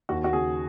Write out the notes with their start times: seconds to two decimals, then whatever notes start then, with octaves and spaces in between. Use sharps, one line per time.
0.09 D#2 F#4
0.24 F#4
0.33 C#3 G#4